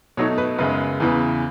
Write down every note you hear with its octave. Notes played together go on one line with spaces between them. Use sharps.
B2 F#3 A3 D#4 C#5
B4
F#2 C#3 G#3 B3 B4
E2 C#3 E3 B3